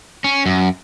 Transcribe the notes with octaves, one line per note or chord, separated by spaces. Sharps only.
C#4
F#2